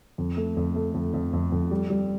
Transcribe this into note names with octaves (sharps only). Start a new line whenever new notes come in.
F2
A3
F2
A3
F2
F2
F2
F2
G3
G3